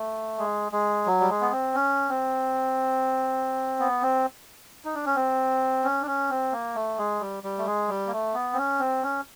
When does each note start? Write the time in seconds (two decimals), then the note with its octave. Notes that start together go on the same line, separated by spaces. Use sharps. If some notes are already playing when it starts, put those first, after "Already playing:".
Already playing: A3
0.38 G#3
0.72 G#3
1.06 F#3
1.20 G3
1.29 G#3
1.41 B3
1.52 C4
1.74 C#4
2.09 C4
3.79 B3
4.02 C4
4.85 D#4
4.95 D4
5.06 C#4
5.16 C4
5.84 C#4
6.02 D4
6.07 C#4
6.30 C4
6.52 A#3
6.75 A3
6.98 G#3
7.21 G3
7.43 G3
7.58 A3
7.66 G#3
7.89 G3
8.07 A#3
8.12 A3
8.34 B3
8.53 C4
8.57 C#4
8.80 C4
9.03 C#4